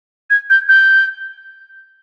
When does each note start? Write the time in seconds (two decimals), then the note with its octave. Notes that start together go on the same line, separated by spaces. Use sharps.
0.30 G#6
0.50 G6
0.69 G6